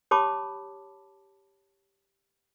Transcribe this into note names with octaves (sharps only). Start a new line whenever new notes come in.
G4 C#5 A5 B5 D6 D#6